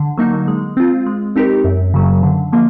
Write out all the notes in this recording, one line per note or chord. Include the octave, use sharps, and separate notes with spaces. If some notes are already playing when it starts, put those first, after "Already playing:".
Already playing: D3
F#3 A#3 D#4
G#3
C4 F4
G#3
C4 D#4 G4 A#4
F#2
C#3 F#3
D3
F3 A#3